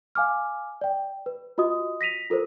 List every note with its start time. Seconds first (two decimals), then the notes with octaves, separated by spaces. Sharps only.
0.15 F5 G#5 D6 F6
0.81 D5 G5
1.26 B4
1.58 F4 F#4 D#5 D#6
2.01 A#6 B6 D#7 F7
2.30 F4 A4 A#4 C5